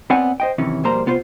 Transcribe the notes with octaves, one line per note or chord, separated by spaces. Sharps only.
B3 C4 C#5 D5 F#5 G#5
C5 D#5 G5
F#2 C3 D#3 E3 C#4
B1 F2 G3 A#3 C5 A#5
C3 B3 F4 C5